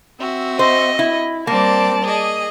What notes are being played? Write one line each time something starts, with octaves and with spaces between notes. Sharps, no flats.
C4 F#4 E5
C5 D#5
E4
G3 A#3 C4 D5 A5
G#4 D#5